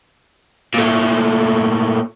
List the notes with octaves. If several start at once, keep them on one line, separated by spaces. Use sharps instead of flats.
A#2 A3